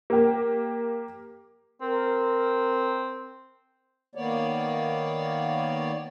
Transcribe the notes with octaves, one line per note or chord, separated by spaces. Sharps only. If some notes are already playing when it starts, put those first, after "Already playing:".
A#3 G4
C4 A#4
D#3 A#3 B3 C#5 D5